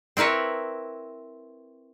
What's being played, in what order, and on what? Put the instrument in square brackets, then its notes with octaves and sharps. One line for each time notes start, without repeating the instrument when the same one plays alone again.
[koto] C4 E4 A#4 B4 C#5